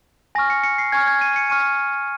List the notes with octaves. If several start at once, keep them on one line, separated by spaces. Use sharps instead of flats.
G#5 C#6 F6 A#6
C#7
C#7
C7
G#5 C#6 F6 G#6
G#6
D#7
C#7
G#5 C#6 F6 D#7